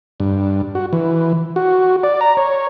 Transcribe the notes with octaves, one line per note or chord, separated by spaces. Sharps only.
G2
F#4
E3
F#4
D5
A#5
C#5